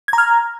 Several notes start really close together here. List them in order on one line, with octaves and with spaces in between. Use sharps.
G#6 A#5 F6